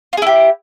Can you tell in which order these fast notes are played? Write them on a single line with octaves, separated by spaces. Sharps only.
F4 G#4 E4 G4